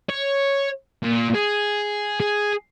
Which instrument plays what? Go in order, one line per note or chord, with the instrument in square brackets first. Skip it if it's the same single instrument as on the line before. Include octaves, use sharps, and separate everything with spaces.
[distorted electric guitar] C#5
A#2
G#4
G#4